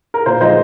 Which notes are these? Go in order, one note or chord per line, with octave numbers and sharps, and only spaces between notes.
A#4
A#2 C5
F3 G#3 C5 D#5